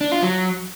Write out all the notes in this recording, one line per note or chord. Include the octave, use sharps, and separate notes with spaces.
D4
F4
F#3